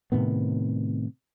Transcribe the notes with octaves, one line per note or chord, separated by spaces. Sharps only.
A2 C3 D#3 B3